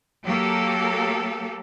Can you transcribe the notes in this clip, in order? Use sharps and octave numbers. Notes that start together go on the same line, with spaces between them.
F#3 A#3 G4 A4